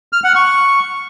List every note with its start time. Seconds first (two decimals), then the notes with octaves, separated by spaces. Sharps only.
0.13 F6
0.24 F#5
0.36 C#6